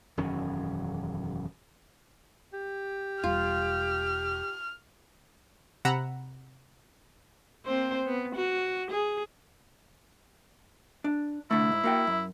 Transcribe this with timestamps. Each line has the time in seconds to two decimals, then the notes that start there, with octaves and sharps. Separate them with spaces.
0.17 E1 F#2 D#3 C#4
2.53 G4
3.23 E1 G3 F4 F6
5.85 C3 F#5 A#5 B5 E6
7.66 A#3 C4 C5
8.05 B3
8.36 F#4
8.91 G#4
11.04 D4
11.51 C2 D3 A3 E4
11.72 G#2
11.84 A#3 F#4 G5
12.07 F#2